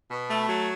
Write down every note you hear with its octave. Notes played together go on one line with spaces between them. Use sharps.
B2
A3
F#3